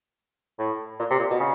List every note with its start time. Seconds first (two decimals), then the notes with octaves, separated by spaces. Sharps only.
0.59 A2
1.00 A#2
1.10 C3
1.19 A#2
1.30 B2
1.39 C#3